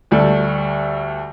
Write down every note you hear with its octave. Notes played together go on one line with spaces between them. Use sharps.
D2 G3 A4